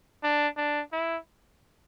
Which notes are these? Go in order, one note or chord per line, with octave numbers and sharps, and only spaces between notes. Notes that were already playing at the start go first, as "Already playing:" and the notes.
D4
D4
E4